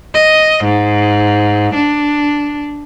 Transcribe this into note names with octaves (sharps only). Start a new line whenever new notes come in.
D#5
G#2
D4